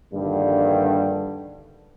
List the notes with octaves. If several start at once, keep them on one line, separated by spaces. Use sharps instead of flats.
A#1 G2 D3 D#3 G3